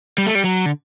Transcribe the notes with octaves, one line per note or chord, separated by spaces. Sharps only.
G3
A3
G3
F#3
D3